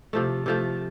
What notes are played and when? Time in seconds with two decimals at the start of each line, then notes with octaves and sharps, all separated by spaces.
0.13 C3 F3 A3
0.46 C3 F3 A3